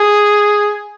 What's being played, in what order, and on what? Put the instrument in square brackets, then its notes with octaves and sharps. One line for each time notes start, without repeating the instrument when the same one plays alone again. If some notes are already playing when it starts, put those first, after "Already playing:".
Already playing: [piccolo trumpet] G#4